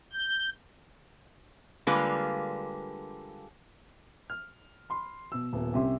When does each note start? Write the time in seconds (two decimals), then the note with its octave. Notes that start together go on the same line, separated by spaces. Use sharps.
0.13 G6
1.87 D3 G3 G#3 A#3 F4 B4
4.30 F6
4.90 B5 C6
5.32 B2 E6
5.53 D#1 B3
5.73 C2 C3 C#4 G4 E5 C6